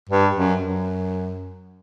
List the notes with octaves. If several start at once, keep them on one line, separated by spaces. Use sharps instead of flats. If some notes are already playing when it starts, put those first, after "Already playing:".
G2
F#2
F#2